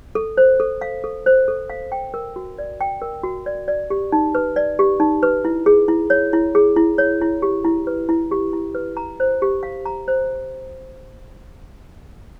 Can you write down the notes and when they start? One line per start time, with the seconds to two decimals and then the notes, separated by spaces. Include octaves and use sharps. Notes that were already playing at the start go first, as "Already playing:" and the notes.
0.15 A4
0.37 C5
0.60 A4
0.81 F5
1.04 A4
1.26 C5
1.48 A4
1.70 F5
1.92 G5
2.14 A#4
2.36 F#4
2.59 D5
2.81 G5
3.02 A#4
3.23 F#4
3.46 D5
3.68 D5
3.90 G4
4.12 D#4
4.35 B4
4.56 D5
4.79 G4
5.00 D#4
5.23 B4
5.45 E4
5.66 G#4
5.88 E4
6.10 C#5
6.33 E4
6.55 G#4
6.76 E4
6.98 C#5
7.21 E4
7.42 G4
7.64 E4
7.87 B4
8.09 E4
8.31 G4
8.53 E4
8.75 B4
8.97 A#5
9.20 C5
9.42 G4
9.63 F5
9.86 A#5
10.08 C5